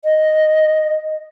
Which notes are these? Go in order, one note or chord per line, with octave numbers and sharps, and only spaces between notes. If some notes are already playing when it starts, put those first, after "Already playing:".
D#5